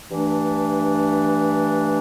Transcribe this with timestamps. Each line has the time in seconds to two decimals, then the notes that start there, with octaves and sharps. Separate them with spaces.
0.10 G2 E3 A3 D4